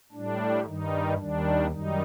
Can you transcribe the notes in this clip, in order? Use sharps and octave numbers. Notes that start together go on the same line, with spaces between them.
A2 G3 D4
G2 D#3 G3 D#4
D#2 D#3 G3 D4
F#2 D#3 G3 D#4